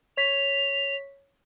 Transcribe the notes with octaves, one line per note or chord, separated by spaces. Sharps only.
C#5 B6 F7